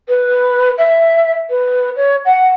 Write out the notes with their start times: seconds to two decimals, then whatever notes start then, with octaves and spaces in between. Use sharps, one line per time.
0.08 B4
0.78 E5
1.50 B4
1.96 C#5
2.25 F#5